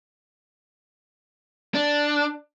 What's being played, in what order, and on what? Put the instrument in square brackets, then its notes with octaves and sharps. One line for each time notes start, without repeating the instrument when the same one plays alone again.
[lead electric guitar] D4